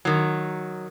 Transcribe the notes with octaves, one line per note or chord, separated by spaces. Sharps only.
D#3 F#3